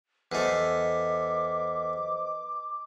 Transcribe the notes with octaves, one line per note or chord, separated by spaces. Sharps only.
E2 A3 B4 C5 D#5 D6